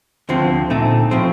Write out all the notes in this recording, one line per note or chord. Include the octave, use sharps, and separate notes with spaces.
D2 D3 F3 C4
A#2 A3 C4 D#4
A2 F3 C4